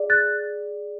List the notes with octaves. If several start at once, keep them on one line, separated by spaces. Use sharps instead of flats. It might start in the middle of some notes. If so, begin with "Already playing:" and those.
Already playing: G#4 D5
F#6 A6